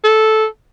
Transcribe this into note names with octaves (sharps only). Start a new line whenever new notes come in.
A4